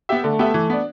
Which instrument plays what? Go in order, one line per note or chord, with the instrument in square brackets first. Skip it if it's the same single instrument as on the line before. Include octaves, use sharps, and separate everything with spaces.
[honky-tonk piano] B3 G4 E5
[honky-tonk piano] D3 [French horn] A3
[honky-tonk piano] B3 G4 E5
E3
B3 D4